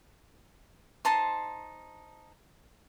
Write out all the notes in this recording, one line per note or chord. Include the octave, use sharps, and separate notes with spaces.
D#4 C5 A5 C6